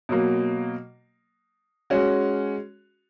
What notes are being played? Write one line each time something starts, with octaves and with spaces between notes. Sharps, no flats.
B2 F#3 A#3
G#3 C#4 F#4